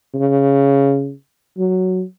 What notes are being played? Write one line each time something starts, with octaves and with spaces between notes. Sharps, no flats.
C#3
F#3